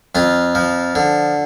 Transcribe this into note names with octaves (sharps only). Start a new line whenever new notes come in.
F2 F4
F3
D3